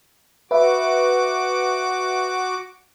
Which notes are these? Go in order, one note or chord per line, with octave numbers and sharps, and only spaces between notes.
F#4 B4 E5 D6